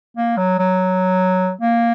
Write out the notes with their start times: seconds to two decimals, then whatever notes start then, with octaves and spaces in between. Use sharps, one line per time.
0.17 A#3
0.37 F#3
0.59 F#3
1.61 A#3